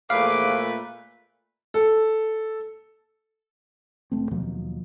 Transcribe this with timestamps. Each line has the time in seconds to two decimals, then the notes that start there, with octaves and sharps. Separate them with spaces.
0.10 E2 A#2 F3 A3 B4 F5 D6
1.74 A4
4.12 F1 A3 C4
4.31 D#2 B2 F3 F#3